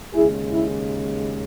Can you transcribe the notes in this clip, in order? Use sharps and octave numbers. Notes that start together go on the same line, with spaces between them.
D#2 C#3 G#3 E4 G#4
E4